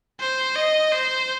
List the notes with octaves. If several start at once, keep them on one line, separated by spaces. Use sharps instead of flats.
C5
D#5
C5